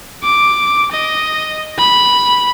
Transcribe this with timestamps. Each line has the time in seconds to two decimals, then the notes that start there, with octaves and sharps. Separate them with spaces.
0.23 D6
0.92 D#5
1.78 B5